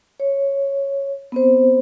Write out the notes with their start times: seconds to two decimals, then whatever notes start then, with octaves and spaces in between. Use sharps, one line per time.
0.20 C#5
1.32 B3 C4 C5